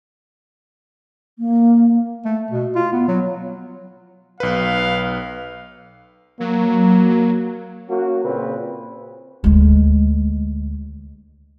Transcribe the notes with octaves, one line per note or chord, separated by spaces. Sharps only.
A#3
A3
B2
F4
B3
F#3
B1 B4 F5
F#3 A#3
A#3 C#4 F#4
A#2 C#3 C4 B4
D2 G#3